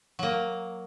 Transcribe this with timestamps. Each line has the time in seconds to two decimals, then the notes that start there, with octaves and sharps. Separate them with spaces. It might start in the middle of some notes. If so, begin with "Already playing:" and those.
0.19 F#3 A#3